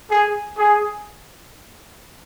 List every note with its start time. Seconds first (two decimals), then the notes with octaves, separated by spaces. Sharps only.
0.11 G#4
0.59 G#4